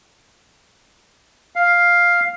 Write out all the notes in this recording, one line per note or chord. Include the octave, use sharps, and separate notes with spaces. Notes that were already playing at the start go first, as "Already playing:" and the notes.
F5